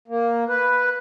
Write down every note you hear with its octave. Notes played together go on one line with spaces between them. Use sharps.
A#3
B4